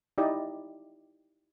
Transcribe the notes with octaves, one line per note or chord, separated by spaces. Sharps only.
D#4 E4 G4 D5 D#5